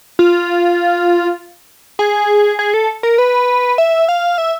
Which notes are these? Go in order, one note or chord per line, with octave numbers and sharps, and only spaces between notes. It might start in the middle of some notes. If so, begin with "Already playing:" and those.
F4
G#4
G#4
A4
A#4
B4
E5
F5
E5